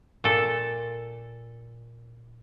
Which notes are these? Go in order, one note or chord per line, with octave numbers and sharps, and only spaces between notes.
A#2 A4